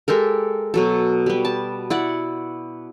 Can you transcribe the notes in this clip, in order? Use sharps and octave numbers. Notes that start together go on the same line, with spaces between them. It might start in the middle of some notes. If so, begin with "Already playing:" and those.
G#3 G4 A4 A#4
B2 F#3 A4
G3 B3
A5
E4 D5 F#5